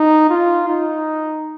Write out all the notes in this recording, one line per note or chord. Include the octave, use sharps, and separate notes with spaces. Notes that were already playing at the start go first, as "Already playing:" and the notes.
Already playing: D#4
F4
D#4